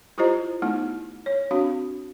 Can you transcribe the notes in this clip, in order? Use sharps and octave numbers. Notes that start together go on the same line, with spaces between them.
E4 F4 G4 C5 D#5 A#5
A3 B3 D#4 E4
C#5
C4 D4 F#4 F5